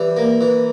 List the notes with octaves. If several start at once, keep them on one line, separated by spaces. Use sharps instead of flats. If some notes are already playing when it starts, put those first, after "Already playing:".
Already playing: E3 G3
A#3
E3